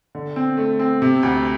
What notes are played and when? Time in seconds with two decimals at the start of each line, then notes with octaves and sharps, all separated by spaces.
0.15 D3
0.36 C4
0.57 A3
0.79 C4
1.02 C3
1.23 D2